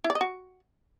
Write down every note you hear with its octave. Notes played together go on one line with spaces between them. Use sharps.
E4
D5
D#5
F#4